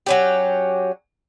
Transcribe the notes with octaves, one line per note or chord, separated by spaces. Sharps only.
F#3 C#4 G4